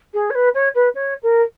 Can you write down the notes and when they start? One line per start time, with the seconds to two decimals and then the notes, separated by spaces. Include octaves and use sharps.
0.13 G#4
0.30 C#5
0.35 B4
0.54 C#5
0.75 B4
0.95 C#5
1.23 A#4